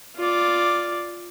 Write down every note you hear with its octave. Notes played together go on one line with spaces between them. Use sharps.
F4 D5